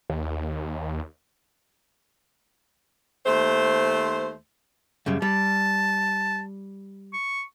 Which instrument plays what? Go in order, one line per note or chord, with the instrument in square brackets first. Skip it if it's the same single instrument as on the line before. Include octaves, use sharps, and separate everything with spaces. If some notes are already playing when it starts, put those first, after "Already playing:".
[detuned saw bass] D#2
[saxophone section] D#2 A3 C5
[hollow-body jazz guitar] F#2 C#3 G3
[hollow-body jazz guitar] G3 [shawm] A5
[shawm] C#6